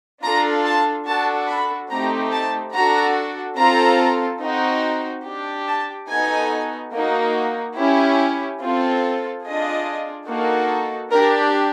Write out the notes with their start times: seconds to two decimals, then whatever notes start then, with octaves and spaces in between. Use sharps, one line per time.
0.23 D4 F4 A4 A#5
0.65 A5
1.07 D4 F#4 A4 A5
1.49 B5
1.90 A3 C4 D#4 G4 A#5
2.33 A5
2.74 D4 F#4 A4 A#5
3.58 C4 F4 A4 A#5
4.41 C4 D#4 F#4
5.26 D4 G4
5.68 A5
6.09 B3 D#4 F#4 A4 G#5
6.93 A#3 D#4 F#4
7.77 C#4 E4 G4
8.60 C4 F4 A4
9.45 D4 F4 G#4 D#5
10.28 A#3 D#4 F#4 A4
11.11 D4 G4 A#4